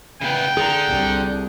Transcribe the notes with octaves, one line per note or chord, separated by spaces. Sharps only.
C#3 B3 G5
D3 G#4 A#5
C2